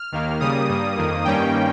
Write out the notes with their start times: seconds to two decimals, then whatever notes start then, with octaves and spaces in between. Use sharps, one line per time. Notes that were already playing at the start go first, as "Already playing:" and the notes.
Already playing: F6
0.12 D#2 D#3 A#3
0.40 C#3 G3 A#3 D#6
0.69 G2 G3 A#3
0.97 F2 D#3 A#3
1.25 G2 D#3 G3 A#3 C#4 G5